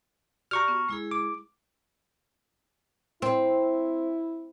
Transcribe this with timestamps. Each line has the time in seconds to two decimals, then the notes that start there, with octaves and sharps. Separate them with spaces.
0.51 F#4 G4 D5 A#5 C#6 F6
0.68 B3
0.88 G#3 E4 G#4
1.11 D6
3.22 C4 E4